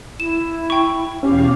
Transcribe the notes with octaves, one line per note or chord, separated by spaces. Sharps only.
E4 E7
G5 C#6
E2 B2 C#4 G4 F5